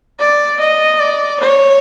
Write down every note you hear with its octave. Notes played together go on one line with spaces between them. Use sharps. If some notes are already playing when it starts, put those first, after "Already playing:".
D5
D#5
D5
C#5